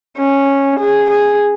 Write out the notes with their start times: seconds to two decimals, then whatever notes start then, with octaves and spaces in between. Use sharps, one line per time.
0.18 C#4
0.80 G#4
1.11 G#4